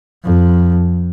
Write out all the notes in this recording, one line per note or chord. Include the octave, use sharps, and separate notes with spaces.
F2